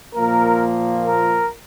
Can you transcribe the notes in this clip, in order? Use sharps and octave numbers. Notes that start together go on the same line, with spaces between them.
A#2 F3 A#3 A#4
A#4